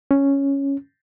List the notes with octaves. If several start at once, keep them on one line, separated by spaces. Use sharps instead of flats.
C#4